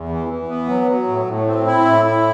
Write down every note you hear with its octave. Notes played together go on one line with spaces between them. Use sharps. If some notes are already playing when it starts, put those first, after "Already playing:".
Already playing: E2
E3
E3
B3
F#3
F#3
A2
A2
C4
E4
A2
E4